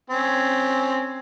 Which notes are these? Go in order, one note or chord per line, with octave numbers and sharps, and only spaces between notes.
C4 C#4